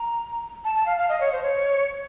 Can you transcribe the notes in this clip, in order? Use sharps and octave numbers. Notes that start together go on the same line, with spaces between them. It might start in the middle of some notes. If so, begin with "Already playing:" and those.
Already playing: A#5
A5
A5
F5
F5
D#5
C#5
C5
C#5